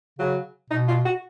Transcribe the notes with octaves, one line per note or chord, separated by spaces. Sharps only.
C#3 F#3
B2 D#4
F4
F#4